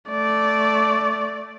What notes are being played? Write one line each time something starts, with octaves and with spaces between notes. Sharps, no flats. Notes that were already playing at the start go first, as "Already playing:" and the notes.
A3 D5